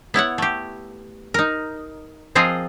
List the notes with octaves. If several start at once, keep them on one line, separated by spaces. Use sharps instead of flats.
B3 E4 C#5 F#5
A3 G4
D#4 A#4
F3 C4 F4 G#4 A#4 D#5